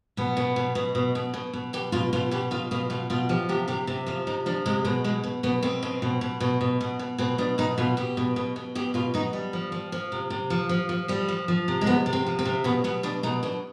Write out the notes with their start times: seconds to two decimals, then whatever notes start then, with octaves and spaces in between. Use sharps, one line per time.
0.17 B2 B3
0.37 B2
0.56 B2
0.75 B2
0.95 B2
1.15 B2
1.34 B2
1.53 B2
1.73 B2 G4
1.92 B2 F4
2.13 B2 F4
2.31 B2 G4
2.51 B2 F4
2.71 B2 F4
2.90 B2 F4
3.10 B2 F4
3.29 F3 G4
3.49 C3 G4
3.68 C3 G4
3.87 C3 G4
4.07 F3 F4
4.27 C3 D#4
4.46 F3 D4
4.66 C3 G#3
4.85 B2 G#3
5.04 B2 G#3
5.23 B2
5.43 B2 B3
5.62 B2 C4
5.83 B2
6.02 B2
6.21 B2
6.40 B2
6.61 B2
6.81 B2
6.99 B2
7.18 B2 C4
7.38 B2 D4
7.58 B2 D#4
7.78 B2 F4
7.97 B2 G4
8.17 B2
8.36 B2
8.56 B2
8.75 B2 G4
8.94 B2 F4
9.14 B2 D#4
9.33 B2 G3
9.53 F3
9.72 F3
9.92 F3
10.12 C3
10.30 C3
10.50 F3
10.69 F3
10.89 F3
11.08 F3 G3
11.28 F3
11.48 F3
11.68 C3
11.81 G#3
11.86 C3 B3
12.06 C3
12.13 C4
12.26 F3
12.39 C4
12.45 C3
12.64 B2 B3
12.84 B2 B3
13.03 B2 D4
13.23 B2 D#4
13.43 B2 D4